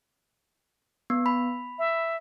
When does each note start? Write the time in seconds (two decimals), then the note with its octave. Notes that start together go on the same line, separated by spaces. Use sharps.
1.10 B3
1.26 B5
1.79 E5